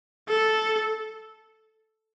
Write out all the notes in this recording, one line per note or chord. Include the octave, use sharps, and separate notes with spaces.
A4